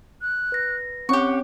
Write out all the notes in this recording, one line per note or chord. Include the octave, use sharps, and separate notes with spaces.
F#6
B4 A#6
C4 C#4 G4 C#5 F#5 C#6